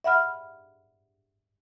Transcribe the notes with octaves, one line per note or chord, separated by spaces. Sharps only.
E5 F#5 B5 F6